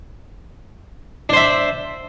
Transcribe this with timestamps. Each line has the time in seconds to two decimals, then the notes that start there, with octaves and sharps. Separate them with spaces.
1.29 D4
1.33 C5
1.36 E5